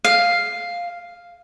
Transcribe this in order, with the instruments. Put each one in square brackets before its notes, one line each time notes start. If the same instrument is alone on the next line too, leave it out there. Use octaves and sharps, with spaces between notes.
[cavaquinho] F5